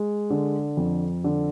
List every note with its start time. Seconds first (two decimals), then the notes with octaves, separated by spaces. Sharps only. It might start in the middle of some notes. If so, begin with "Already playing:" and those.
Already playing: G#3
0.30 D3
0.77 F2
1.24 D3